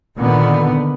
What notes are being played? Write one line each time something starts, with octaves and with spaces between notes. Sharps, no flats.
A#2 D3 D#3 B3